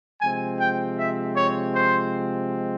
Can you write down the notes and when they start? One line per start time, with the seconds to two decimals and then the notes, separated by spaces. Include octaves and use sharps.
0.21 C3 F3 G#3 C4 G#5
0.60 G5
0.98 E5
1.36 C#5
1.75 C5